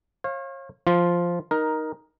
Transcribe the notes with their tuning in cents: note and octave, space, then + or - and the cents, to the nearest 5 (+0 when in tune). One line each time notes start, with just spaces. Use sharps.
C#5 -40 F5 +0
F3 -5 F4 +0
D#4 +0 A#4 +10